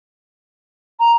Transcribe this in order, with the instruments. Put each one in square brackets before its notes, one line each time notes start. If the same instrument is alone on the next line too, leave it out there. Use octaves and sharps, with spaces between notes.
[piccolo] A#5